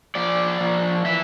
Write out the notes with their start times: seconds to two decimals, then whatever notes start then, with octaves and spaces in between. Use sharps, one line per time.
0.15 F3 D5
0.60 F3
1.05 E3 E5